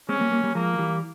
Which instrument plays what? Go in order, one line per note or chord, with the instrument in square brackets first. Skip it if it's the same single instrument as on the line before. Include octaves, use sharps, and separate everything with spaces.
[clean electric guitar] G#3 C4 [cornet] C#4
[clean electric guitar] G3 A#3
G3 A#3
G3 A#3
[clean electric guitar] F3 G#3 [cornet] A#3
[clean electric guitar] G#3
E3 G3